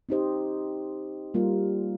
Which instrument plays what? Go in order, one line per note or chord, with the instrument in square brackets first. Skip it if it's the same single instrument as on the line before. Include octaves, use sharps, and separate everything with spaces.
[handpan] C4 D#4 G4 C5 D#5
G3 A#3 F4 A#4